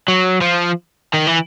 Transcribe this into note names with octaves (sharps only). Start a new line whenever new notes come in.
F#3
F3
D#3
E3